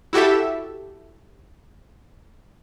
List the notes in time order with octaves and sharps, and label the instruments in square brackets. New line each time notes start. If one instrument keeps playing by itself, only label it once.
[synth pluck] E4 F#4 G4 A4 E5